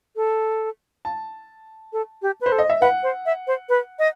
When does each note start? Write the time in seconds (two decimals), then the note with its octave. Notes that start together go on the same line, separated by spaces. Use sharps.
0.16 A4
1.05 A5
1.93 A4
2.22 G4
2.41 B4
2.46 C5
2.52 A4
2.58 D#5
2.70 E5
2.81 B4 F#5
3.03 C5
3.26 E5
3.47 C5
3.69 B4
3.99 D#5